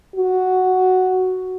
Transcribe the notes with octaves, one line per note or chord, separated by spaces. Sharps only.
F#4